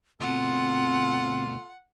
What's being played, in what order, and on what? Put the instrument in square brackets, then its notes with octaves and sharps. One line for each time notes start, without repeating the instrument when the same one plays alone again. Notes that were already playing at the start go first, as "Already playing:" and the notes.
[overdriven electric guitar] D2 B2 [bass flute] C4 [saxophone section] F4 A4 [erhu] F#5